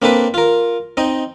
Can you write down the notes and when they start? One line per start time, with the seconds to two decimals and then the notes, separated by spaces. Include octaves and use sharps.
0.02 A#3 C4 D4 A4 B4
0.34 F4 A#4
0.97 C4 D#4 D#5